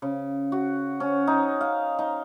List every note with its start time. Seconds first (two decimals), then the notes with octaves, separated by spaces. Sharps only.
0.02 C#3
0.52 F#4
1.00 C#4
1.27 D#4
1.61 F5
1.99 D#4